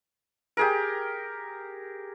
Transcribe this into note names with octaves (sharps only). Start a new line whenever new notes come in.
G4 G#4 A#4